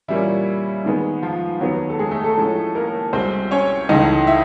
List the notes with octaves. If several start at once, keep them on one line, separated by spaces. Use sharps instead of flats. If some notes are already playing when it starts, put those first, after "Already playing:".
A#2 E3 G3 A#3 C#4 E4
G#2 D#3 G#3 B3
F3 F4
D#2 D#3 F#3 B3 F#4
A4
G#3 G#4
A3 A4
A3 A4
A2 F3 G#3 C#4
A#3 A#4
C2 B2 G#3 C4 C5
C#4 C#5
C#2 C#3 E3 A3 D#4 D#5
E4 E5